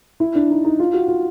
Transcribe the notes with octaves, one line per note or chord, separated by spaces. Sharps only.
E4
D4
D#4
D#4
F4
F#4
F4